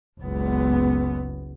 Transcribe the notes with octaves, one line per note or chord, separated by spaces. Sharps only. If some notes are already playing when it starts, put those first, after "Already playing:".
F#1 C#2 B3